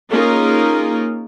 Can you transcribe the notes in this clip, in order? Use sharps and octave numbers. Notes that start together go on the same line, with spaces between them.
A#3 C#4 D#4 F4 G#4 A#4